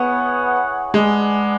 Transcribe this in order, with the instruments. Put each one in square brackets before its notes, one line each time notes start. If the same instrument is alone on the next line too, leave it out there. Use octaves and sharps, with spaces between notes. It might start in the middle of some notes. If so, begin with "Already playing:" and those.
Already playing: [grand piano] B3 [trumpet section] E4 G#4 C#5 F#5
[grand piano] G#3 [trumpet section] D4 G#4 B4 D5 F#5